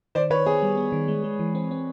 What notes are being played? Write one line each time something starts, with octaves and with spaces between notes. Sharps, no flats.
D#3 C5 D5
D#3 B4 C#5
B3 G#4
G3
B3
D#3
G#3
G#3
E3
C4
C4